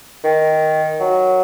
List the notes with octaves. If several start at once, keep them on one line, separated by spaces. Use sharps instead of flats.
D#3
F#3